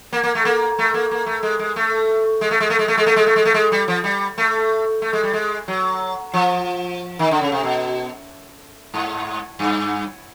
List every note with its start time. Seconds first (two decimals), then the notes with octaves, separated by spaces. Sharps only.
0.13 A#3
0.23 A#3
0.35 A3
0.45 A#3
0.79 A3
0.94 A#3
1.11 A#3
1.26 A3
1.43 G#3
1.59 G#3
1.76 A3
2.41 G#3
2.51 A3
2.60 G#3
2.70 A3
2.79 G#3
2.88 A3
2.97 G#3
3.06 A3
3.16 G#3
3.26 A3
3.36 G#3
3.45 A3
3.54 G#3
3.72 G3
3.88 F3
4.04 G3
4.38 A3
5.02 A3
5.13 G#3
5.23 G3
5.33 G#3
5.68 F#3
6.34 F3
7.19 D#3
7.31 D3
7.41 C#3
7.52 C3
7.63 B2
8.94 G#2
9.59 G2